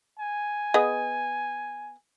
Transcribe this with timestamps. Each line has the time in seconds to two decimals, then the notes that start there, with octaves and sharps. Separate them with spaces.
0.20 G#5
0.74 B3 G#4 D#5